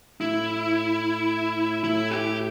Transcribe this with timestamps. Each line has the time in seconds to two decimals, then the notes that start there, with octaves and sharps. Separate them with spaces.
0.21 A2 E4
1.84 A2 E4
2.11 G4